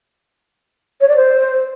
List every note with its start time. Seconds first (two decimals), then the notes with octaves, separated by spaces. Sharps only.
1.01 C#5
1.09 D5
1.16 C5